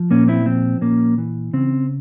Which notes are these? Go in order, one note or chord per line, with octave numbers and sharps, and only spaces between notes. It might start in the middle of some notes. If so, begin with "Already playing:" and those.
Already playing: F3
A#2 A#3 C#4
C4 E4
F3 C4
A#2 A#3 C#4
E3
C#3 C4